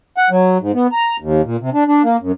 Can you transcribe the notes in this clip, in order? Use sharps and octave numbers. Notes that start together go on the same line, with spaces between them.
F#5
F#3
G#2
B3
A#5
D#2
A#2
C3
D4
D4
A#3
F#2